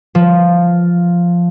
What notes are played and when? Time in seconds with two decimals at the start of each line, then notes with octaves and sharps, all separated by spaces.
0.15 F3